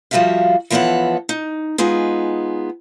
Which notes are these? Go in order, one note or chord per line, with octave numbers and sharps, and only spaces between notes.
F3 G3 F#4 A4 E5 F5
E3 F3 B3 A4 C#5 F#5
D#4
G#3 B3 D#4 F4 G#4